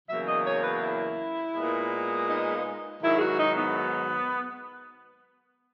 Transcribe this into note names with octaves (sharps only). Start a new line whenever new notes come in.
E2 C#3 F#3 A#3 E5
D#5
C#5
B4
E4
A#2 G#3 B3
D#4
G#2 D#3 F#3 E4
G#4
F#4
D#4
B3